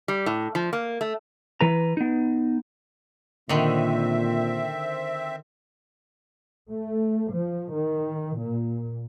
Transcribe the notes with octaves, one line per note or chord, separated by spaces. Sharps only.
G3
A2
F3
A#3
A3
E3 B4 A#5
B3 D#4
A#2 D3 D#3 C4 E5
A3
F3
D#3
A#2